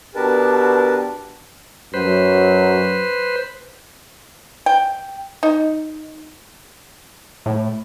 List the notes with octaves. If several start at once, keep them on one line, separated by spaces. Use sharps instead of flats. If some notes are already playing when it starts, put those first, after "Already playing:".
B2 D4 G4 A#4 B4 A5
F#2 F#3 B4 C5
G5
D#4
A2